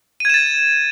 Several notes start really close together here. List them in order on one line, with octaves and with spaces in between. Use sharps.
D#7 G#6 E7 A6